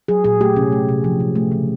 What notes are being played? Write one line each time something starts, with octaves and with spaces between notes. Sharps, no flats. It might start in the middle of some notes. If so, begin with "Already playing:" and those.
F#3 G#4
A#2 G#4
A3 G4
C3 C#4
A3
C3
F3
C3
A3
C#3